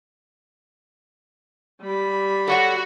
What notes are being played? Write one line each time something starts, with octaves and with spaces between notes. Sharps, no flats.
G3 B5
F#4 A4 C#5 F#5